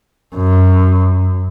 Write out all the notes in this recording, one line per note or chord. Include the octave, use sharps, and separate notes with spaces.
F#2